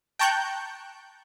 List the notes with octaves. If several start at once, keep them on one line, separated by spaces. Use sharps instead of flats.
G5 A5 A#5 C#6 F#6 G6